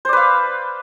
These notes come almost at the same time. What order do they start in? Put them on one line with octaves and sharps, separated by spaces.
C5 D5 B4 F5